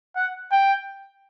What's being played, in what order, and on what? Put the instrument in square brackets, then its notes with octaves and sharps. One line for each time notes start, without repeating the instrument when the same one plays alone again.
[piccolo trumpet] F#5
G5